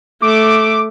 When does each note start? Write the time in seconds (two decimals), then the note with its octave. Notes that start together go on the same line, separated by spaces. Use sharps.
0.22 A3 D6